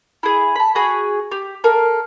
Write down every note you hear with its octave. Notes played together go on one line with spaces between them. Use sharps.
E4 G#4
A5 B5
F#4 G#4 B5
G4
A4 A#4 F5